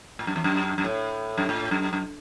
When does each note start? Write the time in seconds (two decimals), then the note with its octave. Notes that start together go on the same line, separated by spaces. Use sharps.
0.19 A2
0.27 F#2
0.36 E2
0.44 F#2
0.78 F#2
0.84 A2
1.38 F#2
1.49 A2
1.71 F#2
1.93 F#2